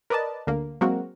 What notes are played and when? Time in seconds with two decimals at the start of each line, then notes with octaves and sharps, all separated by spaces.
0.10 A#4 B4 D5 D#5 A5
0.47 D2 D3 A#3
0.81 F#3 G#3 A#3 C4 F#4 A#4